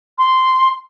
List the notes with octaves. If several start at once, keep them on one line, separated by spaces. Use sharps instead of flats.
C6